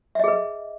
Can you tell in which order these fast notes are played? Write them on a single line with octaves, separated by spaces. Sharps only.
E5 D#5 G#4 B4